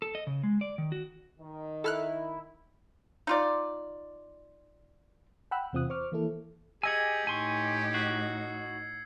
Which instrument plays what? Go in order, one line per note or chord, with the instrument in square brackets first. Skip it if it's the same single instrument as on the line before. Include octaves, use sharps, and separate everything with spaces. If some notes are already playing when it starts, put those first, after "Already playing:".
[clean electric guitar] A4
D#5
C#3
G#3
D5
D#3
F#4
[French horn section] D#3
[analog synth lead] E4 [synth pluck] A4 F6 F#6
[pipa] D#4 F4 D5
[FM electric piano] F#5 G5 B5 E6 F#6
E2 C3 C4 F4 D#6 F#6
C5 C#6 D6 F6
E3 A#3 E4 A4
[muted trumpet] G4 [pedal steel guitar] G#4 D#5 G#5 [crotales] E6 G#6 C#7
[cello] A2 D#4 [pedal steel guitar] G#5 C6 C#6
[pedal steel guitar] F#4 [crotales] C7